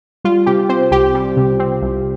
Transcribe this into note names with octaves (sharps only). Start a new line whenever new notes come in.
G3 F4
C3 G4
C4 C5
C2 G4
G3
C3
C4
C2